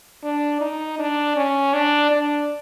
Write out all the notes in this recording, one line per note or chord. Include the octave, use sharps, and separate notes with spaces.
D4
D#4
D4
C#4
D4
D4